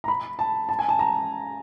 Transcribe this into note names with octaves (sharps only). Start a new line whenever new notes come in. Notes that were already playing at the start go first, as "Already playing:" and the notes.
A#5
B5
A5
A5
G#5
A5
A#5